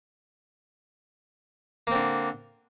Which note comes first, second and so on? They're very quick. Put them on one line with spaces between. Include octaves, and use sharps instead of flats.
A#3 C4 D3